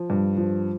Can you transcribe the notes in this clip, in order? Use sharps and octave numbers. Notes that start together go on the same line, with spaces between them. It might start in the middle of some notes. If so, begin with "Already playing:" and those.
Already playing: F3
G2
F3